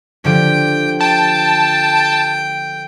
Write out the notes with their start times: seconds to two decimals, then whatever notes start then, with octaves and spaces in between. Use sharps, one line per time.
0.25 D3 F3 G4 G5
1.01 G5 A5